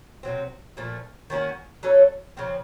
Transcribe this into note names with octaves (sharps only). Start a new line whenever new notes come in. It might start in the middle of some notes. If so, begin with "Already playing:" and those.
C3 F#3 C4
A#2 F3 A3
D#3 A#3 C#4 F#4
F#3 A3 C#4 A4
C#3 F3 C4